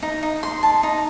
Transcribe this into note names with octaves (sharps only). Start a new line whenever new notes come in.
D#4
D#4
C6
A5
D#4